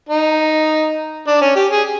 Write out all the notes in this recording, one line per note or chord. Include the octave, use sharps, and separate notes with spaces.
D#4
D4
C#4
G4
G#4